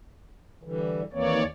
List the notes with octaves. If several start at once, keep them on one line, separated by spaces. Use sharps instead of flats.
D3 E3 G3
D#2 E3 A#3 C4 C#5 D5